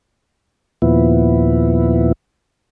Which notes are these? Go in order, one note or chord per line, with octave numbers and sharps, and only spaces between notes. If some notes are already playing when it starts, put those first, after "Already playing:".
D#2 A#2 F3 B3 E4